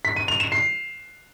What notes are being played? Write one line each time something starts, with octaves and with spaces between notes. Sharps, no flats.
B6
D#7
F7
E7
C7